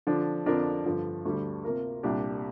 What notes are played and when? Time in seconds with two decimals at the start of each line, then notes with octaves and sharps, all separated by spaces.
0.07 D3 F3 D4
0.46 F2 D3 F3 D4 A#4
0.85 G2 D3 F3
1.25 D2 D3 G3
1.64 C3 A#3 F4 A#4
2.03 C2 A#2 G3 D4 G4